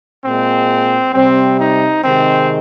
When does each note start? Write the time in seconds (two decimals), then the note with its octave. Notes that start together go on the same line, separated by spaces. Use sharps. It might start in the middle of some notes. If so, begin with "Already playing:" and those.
0.24 A#2 G#3 C4
1.14 C3 G3 C4
1.60 D#4
2.04 C3 D#3 G#3 C4